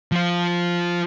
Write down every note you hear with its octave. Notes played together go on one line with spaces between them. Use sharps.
F3 F4